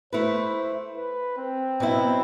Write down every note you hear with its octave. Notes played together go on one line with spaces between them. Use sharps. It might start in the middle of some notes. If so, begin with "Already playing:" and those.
A3 E4 B4 C5
B4
C4
B2 F#3 B3 E4